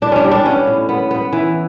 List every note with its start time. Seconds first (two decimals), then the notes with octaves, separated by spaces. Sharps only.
0.02 A2 D4
0.12 C#4 D4
0.24 G3
0.31 D4
0.45 B3 C#4
0.67 A2
0.89 B3
1.11 B3
1.33 E3